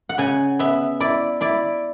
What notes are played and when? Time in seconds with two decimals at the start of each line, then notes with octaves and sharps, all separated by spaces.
0.09 F#5
0.18 C#3 G#5
0.59 B3 E5
1.00 E4 D5
1.41 E4 D5